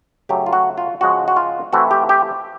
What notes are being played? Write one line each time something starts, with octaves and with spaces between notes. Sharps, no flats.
C#3 F#3 A3 G4
F4
F#4
F4
C#3 F3 G#3 F#4
F#4
F4
E3 A3 C4 E4 F#4
G4
G4